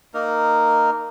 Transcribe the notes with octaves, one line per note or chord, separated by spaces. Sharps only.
A#3 D#4 A#4